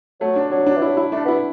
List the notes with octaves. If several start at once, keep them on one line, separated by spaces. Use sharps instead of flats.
F#3 A3
D4
F#3 D4
D4
E3
F#3 E4
E4
A3 D4
B3 E4